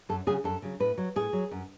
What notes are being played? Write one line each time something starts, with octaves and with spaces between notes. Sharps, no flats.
F#2 A4
C#3 F#3 G#4
F#2 A4
C#3 F#3
A2 B4
F#3
A2 G#4
F#3
F#2